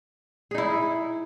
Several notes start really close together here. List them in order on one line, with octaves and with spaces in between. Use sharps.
G#4 D#4 E4